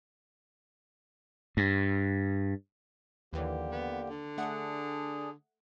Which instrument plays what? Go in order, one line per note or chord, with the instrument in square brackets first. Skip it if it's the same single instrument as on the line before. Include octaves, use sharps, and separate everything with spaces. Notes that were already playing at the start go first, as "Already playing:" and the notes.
[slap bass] G2
[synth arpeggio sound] D#2 E3 F#3 [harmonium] D3 A#3 G4
[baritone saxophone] B3
D3
[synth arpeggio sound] A3 F#5 [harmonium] D4 G#4